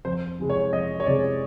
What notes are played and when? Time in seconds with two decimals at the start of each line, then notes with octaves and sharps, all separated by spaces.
0.05 F2 C5
0.38 C3 E3 G#3
0.50 C#5
0.73 F2 D#5
1.00 C#5
1.06 C3 E3 G#3 D5